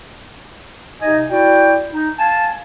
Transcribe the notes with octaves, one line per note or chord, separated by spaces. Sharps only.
C3 D#4 D#5 G#5
E4 F#4 D5 G5
D#4
F5 G#5 A5